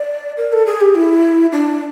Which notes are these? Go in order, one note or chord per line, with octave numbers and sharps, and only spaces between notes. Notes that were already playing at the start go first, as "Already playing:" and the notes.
Already playing: D5
A#4
A4
G#4
G4
E4
D4